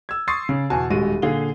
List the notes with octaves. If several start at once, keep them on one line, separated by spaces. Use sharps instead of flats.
E6 G#6
C6 C#6 D#6 A6 C7
C#3
E2 B2 F#4 G#5 A5
D#1 G#3 F#4 D#7
A#2 D3 G#4 F5 G7